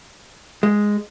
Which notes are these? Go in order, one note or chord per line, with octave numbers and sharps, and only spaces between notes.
G#3